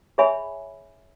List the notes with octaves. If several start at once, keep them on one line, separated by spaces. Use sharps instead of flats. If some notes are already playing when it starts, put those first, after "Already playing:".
G#4 C#5 E5 G#5 B5